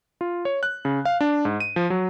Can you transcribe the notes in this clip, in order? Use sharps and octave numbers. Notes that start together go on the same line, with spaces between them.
F4
C#5
F#6
C#3
F5
D4
G#2
D#7
F3
F#3